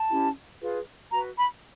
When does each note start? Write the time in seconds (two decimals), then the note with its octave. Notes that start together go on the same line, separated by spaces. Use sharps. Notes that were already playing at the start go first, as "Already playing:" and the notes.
Already playing: A5
0.10 C#4 E4 G4
0.62 F4 G#4 B4
1.12 F#4 B4 A#5
1.38 B5